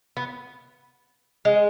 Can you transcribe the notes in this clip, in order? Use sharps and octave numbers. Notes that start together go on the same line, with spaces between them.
B3
G#3